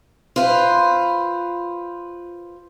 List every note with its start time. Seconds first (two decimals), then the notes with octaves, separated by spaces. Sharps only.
0.36 F4 B4 C5